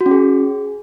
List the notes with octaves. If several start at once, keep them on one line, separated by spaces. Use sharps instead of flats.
F#4
C#4
G#4